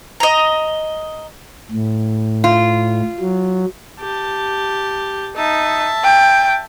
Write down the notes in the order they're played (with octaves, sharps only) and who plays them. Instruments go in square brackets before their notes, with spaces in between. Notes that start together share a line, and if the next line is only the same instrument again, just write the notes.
[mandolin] D#5 A#5
[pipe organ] A2
[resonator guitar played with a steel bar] F4
[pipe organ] F#3
[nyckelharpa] G4 A5
[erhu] D#4 [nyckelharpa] E5 A5
[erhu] G5